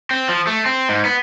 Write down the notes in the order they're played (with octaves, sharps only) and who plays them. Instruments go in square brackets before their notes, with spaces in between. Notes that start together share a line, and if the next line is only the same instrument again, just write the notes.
[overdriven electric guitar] C4
F3
A3
C4
G#2
B3